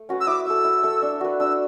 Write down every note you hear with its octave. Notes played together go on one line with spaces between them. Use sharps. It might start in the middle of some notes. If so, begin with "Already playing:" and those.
Already playing: A3
C#4 F#4 B4
E6
E4 D6
A4 E5 E6
E4
A4 E5
D4
F#4 B4
D4 E6